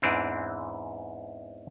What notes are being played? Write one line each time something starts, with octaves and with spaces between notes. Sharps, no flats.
E2 G#2 E3 C4 D4